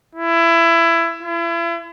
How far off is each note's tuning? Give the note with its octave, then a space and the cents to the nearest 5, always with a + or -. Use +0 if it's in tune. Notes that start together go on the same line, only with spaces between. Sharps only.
E4 +20
E4 +40